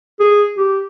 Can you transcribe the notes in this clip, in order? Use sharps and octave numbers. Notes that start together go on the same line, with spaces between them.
G#4
G4